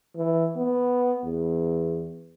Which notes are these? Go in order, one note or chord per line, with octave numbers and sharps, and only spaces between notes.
E3
B3
E2